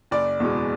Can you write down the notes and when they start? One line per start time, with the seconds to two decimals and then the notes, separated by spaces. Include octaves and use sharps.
0.11 F#1 D5
0.40 E2 B2 G#3